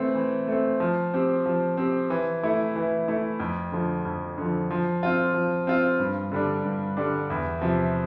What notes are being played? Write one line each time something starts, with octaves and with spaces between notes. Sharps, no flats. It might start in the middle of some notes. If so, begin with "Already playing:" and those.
Already playing: E3 A3 C4
E3
A3 C4
F3
C4 G4
F3
C4 G4
E3
A3 E4
E3
A3 E4
F2
D3 F3
F2
D3 F3
F3
C4 F4
F3
C4 F4
G2
D3 G3 D4
G2
D3 G3 D4
E2
C3 F3